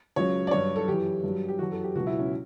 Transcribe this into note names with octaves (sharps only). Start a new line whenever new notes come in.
C#2 C#3 F#3 C#5
D5
G2 F#3 C#5
A4
F#2 E3 G4
G2 F#3
G4
F#2 E3 F#4
A4
G4
C#2 B2 F#3 F#4
E4
C#4